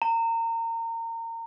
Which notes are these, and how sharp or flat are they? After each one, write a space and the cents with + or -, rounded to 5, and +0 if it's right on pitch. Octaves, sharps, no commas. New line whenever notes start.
A#5 -30